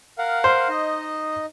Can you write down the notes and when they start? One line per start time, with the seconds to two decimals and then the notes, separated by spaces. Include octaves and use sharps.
0.18 A#4 F5 F#5
0.44 C5
0.69 D#4 D#5